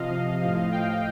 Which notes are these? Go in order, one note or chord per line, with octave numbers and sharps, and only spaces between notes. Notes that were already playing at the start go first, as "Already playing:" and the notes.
Already playing: C3 F3 D#5 F5
A2 F3
F5 G5